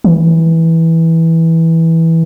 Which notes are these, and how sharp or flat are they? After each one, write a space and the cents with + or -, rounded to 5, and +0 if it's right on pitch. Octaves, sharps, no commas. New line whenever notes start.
E3 -10